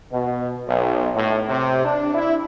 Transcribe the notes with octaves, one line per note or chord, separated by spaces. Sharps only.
B2
B1
A2
C3
D4
E4